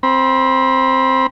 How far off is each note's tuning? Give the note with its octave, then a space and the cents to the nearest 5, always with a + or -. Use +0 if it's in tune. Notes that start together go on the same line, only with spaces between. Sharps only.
C4 +5 B5 -35